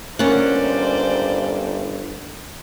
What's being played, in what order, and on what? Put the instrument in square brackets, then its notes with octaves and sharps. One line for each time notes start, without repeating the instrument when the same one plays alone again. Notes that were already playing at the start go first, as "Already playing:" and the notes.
[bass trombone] G1 [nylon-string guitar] A#3 [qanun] C#4 F#5 [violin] C5 D5